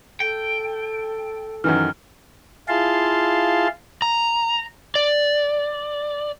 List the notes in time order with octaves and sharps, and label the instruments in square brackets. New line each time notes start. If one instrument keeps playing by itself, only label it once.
[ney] A4 [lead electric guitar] G5
[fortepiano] F#2 D#3 E3 [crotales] F6
[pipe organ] E4 F4 G#4 F5 A5 C6
[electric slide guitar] A#5
D5